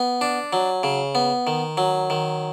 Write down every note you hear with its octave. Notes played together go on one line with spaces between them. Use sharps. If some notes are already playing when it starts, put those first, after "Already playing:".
Already playing: B3
D4
F#3
C#3
B3
D#3
F#3
D#3